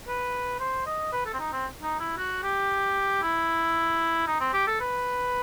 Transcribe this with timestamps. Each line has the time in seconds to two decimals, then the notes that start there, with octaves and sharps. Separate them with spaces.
0.08 B4
0.60 C5
0.86 D#5
1.13 B4
1.26 A4
1.34 C4
1.39 D#4
1.52 C4
1.83 D#4
2.00 E4
2.18 F#4
2.43 G4
3.22 E4
4.27 D#4
4.40 C4
4.53 G4
4.67 A4
4.80 B4